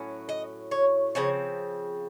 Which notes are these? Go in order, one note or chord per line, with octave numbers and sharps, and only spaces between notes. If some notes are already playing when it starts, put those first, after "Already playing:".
Already playing: A2 F#3 C#4
D#5
C#5
C#3 F3 C4 C#5